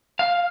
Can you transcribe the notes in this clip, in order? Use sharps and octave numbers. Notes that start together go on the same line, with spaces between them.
F5